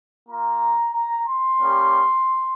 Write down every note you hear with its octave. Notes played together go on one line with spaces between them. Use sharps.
A#3 F4 A#5
A#5
C6
G3 A#3 C#4 G4